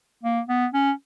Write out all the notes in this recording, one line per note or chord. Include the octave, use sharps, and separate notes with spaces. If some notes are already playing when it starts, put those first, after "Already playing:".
A#3
B3
C#4